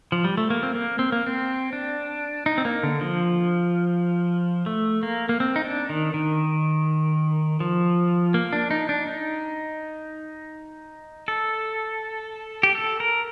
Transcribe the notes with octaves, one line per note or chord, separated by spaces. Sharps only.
F3
G3
A3
A#3
C4
A#3
C4
A#3
C4
D4
D#4
C4
A#3
D3
F3
A3
A#3
A#3
C4
D#4
D4
D#3
D#3
F3
A#3
D4
D#4
D4
D#4
A4
G4
A4
A#4